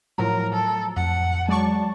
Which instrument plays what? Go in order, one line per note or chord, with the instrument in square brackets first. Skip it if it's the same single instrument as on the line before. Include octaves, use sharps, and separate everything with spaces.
[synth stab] A2 F3 F#3 [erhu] A#4 [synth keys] A#5
[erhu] A4
[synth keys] F2 [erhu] F#5
[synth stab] F#3 D5 C#6 [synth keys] G#3 [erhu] A5